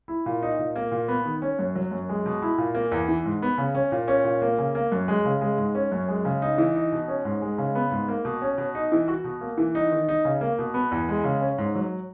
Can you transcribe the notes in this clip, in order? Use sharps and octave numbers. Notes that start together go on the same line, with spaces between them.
E4
A#2
D#4
A#2
A#3
A#2
B3
D#3
C#4
F#2
F#3
F#2
G#3
B2
E4
A#2
A#3
E2
E3
G#2
B3
C#3
C#4
A#2
C#4
A#2
A#3
C#3
A#3
F#2
G#3
C#3
G#3
G#2
C#4
F#2
G#3
C#3
D#4
E3
D#4
B2
C#4
G#2
G#3
C#3
B3
G#2
A#3
B2
C#4
B2
D#4
E3
F#4
B2
A#3
E3
D#4
D#3
D#4
C#3
A#3
B2
B3
E2
G#3
C#3
C#4
G#2
F#3